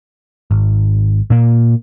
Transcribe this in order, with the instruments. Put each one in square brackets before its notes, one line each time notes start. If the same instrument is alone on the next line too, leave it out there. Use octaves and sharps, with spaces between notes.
[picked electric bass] G#1
A#2 A#3